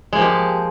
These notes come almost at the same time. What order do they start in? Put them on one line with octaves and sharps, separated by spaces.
G#3 A#3 F3 G4